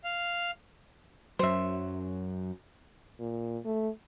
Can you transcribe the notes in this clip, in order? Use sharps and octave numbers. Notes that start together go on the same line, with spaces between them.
F5
F#2 F#3 C5 E5
A#2
A3